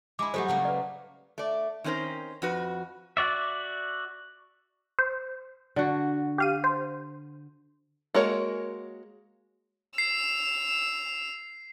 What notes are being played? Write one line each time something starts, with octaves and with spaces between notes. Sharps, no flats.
G#3 E4 B5 D6
F#3 G3 A3 G4 A4 C5
C#3 A3 A#3
B4 D5
A3 D5
D#3 C4 C#4 A#4 C5
F2 F#4 B4
F#4 D5 E5
C5
D3 F#4
G4 F5 D#7
C5
G#3 A#3 F#4 A#4 C#5
E6 C7 F7